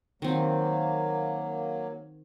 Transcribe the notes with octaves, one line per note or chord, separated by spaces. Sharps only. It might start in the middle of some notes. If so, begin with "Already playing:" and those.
D#3 F#3 A#3 C4